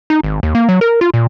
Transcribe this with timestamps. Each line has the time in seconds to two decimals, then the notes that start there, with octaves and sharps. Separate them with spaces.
0.10 D#4
0.23 G#1
0.43 D#2
0.55 A#3
0.69 F#3
0.81 A#4
1.01 F4
1.14 A#2